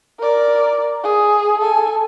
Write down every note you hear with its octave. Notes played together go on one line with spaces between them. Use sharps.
A#4 D5
G#4
A4 G#5